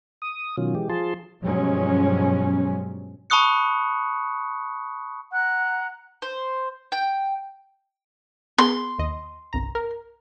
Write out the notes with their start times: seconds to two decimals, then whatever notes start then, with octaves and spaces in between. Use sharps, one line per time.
0.22 D#6
0.57 B2 D#3 F#3 C#4 F4
0.75 E3 G#3 G4
0.89 F3 F4 G#4 A5 C6
1.43 G2 B2 F3 F#3 G#3 C#4
3.30 A5 B5 C#6 D#6 F#6 C#7
5.33 F#5 A#5 F#6
6.22 C5
6.92 G5
8.58 B3 G#4 C6
8.99 D#2 D#5
9.53 G1 C2 A#5
9.75 A#4